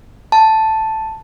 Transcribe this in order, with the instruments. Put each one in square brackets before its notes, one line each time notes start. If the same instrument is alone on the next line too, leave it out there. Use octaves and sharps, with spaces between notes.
[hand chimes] A5